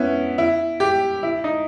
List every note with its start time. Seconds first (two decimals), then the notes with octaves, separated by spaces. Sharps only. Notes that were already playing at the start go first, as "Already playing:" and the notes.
Already playing: B3 C#4 E4
0.38 E4
0.80 G4
1.23 E4
1.44 D#4